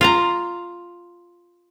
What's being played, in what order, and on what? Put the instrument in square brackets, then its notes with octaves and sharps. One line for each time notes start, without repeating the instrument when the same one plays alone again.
[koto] F4 F5 A#5